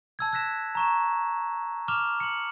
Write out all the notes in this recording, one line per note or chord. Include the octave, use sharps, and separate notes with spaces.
A5 E6 G#6
E6 F#6 A#6 B6 E7
A#5 C#6 E7
D6 F6 E7 F7 G7
C#7 F#7